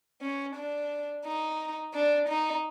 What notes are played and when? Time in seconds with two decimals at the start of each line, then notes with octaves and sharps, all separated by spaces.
0.22 C#4
0.56 D4
1.25 D#4
1.94 D4
2.29 D#4